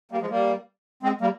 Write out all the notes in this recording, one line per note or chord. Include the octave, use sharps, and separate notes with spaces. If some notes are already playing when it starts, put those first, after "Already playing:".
G3 A#3
F3 G#3
G3 A#3
G#3 C4
G3 A#3